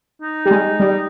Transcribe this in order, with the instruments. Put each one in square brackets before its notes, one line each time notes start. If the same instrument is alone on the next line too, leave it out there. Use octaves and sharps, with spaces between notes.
[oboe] D#4
[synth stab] G3
G#3
G3